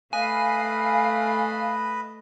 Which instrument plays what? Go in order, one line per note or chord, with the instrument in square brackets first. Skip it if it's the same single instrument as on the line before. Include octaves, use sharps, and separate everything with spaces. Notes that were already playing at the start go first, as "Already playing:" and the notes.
[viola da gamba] A3 [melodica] B4 D#5 B5 [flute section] F5 [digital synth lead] G#5